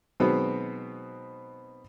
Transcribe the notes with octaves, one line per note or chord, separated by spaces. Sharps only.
B2 D#3 F#3 G#3 B3 C4